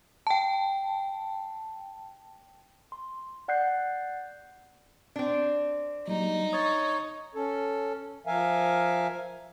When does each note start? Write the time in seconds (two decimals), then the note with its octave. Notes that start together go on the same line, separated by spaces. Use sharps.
0.27 G5 A5
2.92 C6
3.48 D5 F#5 F#6 G6 C7
5.16 C4 D4
6.08 F#3 G3 A#3 D#4
6.53 C#5 D#6 A6
7.35 C#4 A4
8.27 F3 A#4 E5 F5 G#5